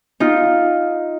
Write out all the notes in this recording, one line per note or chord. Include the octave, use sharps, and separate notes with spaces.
D#4 F4